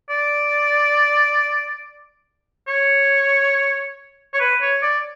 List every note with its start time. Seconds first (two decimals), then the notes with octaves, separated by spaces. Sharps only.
0.10 D5
2.68 C#5
4.34 C#5
4.40 B4
4.62 C#5
4.83 D5